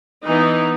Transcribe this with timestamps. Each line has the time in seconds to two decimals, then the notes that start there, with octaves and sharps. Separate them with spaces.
0.24 E3 B3 D#4